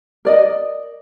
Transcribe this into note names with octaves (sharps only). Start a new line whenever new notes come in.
A#4 D5 D#5